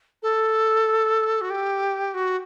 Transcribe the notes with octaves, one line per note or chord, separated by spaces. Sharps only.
A4
F#4
G4
F#4